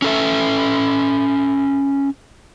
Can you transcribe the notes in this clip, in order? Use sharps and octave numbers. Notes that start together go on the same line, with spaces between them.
C#4 A4 E5